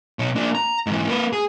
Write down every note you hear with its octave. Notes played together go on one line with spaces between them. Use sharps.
B2 C#5
A#3 D4
A#5
G#2 E3
A#3 B4
G#4